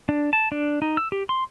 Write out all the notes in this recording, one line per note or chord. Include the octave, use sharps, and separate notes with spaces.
D4
A5
D4
D#4
E6
G4
C6